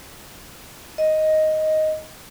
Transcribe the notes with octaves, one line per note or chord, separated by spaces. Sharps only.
D#5